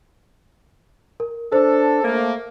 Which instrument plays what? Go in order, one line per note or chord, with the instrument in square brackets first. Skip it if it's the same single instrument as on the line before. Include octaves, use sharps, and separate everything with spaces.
[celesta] A#4
[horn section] D4 A4 [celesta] C5
[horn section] A3 A#3